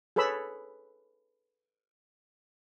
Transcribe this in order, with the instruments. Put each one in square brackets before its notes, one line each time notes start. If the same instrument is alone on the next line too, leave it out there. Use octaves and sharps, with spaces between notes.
[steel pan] G#4 A4 B4 C#5 B5 E6